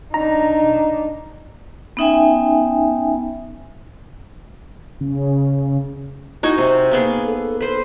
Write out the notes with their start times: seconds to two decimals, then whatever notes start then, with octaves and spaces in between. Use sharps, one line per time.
0.14 D4 D#4 A#5
1.97 B3 C#4 D#4 E5 G5 G#5
5.01 C#3
6.43 D#4 E4 F#4 G#5
6.58 C3 C5
6.91 A#3 B3 G#4
7.26 A4
7.60 A4 B4 C5